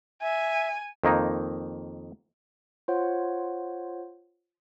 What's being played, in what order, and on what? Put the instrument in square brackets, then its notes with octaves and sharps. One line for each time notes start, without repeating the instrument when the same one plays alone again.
[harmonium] E5 [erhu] G#5
[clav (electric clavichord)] F2 D#3 A#3 D#4
[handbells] F4 C5 C#5 F#5